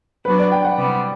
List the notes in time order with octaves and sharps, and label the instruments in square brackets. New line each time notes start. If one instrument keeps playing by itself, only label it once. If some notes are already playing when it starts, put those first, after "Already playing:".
[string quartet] F#3 B3 D4 F#4 [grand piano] B4
[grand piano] D5
G5
F#5
[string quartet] C3 G3 B3